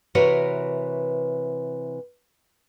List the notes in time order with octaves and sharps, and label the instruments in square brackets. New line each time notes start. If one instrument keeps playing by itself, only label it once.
[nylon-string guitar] C3 E3 F#4 A#4 B4 C#5